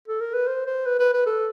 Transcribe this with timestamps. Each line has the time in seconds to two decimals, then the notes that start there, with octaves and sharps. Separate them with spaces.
0.07 A4
0.20 A#4
0.34 B4
0.47 C5
0.66 C5
0.86 B4
0.99 B4
1.13 B4
1.26 A4